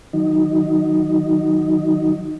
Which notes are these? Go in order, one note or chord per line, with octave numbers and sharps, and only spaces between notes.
D#3 F#3 D#4